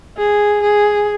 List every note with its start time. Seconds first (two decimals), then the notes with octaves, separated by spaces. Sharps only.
0.18 G#4
0.63 G#4